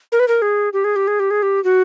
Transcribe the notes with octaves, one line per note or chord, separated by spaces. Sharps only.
A#4
B4
A#4
G#4
G4
G#4
G4
G#4
G4
G#4
G4
F#4